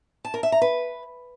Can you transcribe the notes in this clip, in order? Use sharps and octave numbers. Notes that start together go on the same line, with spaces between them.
A5
A#4
E5
A#5
B4